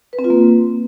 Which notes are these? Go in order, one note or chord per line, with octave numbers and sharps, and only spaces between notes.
B4
C4
F4
A#3